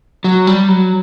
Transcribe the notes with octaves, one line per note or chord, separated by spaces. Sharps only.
F#3
G3
F#3